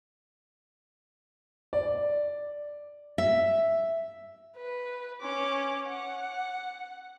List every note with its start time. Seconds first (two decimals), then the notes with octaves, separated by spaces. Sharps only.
1.73 D5
3.18 E5
4.57 B4
5.21 C#4 D6
5.87 F#5